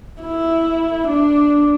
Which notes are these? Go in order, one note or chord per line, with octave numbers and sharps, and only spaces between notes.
E4
D4